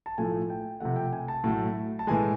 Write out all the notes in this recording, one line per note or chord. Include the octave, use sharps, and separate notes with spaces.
A5
A2 F3 A3 G#5
G5
C3 F3 A3 F#5
G5
G#5
A5
A2 F#3 A3
A5
A2 E3 G#3 G#5